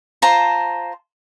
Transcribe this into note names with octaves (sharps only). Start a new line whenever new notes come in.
F4 C5 A5 A#5